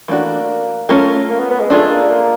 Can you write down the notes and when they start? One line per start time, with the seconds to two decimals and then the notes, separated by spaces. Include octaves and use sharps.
0.08 E3 A3 A#3 D4 F#4
0.89 A3 C#4 F4 A#4
1.30 A#3
1.40 B3
1.50 B3
1.60 G#3
1.70 A3 D4 F4 G#4
1.90 A#3
2.10 A#3